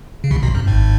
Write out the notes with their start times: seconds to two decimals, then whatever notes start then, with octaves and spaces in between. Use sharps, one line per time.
0.24 C#3
0.31 C2 C3
0.43 B1 B2
0.55 F#2
0.67 G#1 G#2